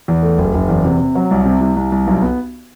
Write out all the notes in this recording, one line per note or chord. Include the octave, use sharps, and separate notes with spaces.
E2
A3
F#1
F#1
E2
C3
C3
F#3
C2
C3
C2
C2
C2
B1
B3